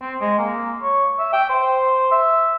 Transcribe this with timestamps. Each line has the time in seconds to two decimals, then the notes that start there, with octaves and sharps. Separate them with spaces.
0.01 C4
0.21 G#3
0.38 A#3
0.82 C#5
1.19 E5
1.33 G5
1.50 C5
2.12 E5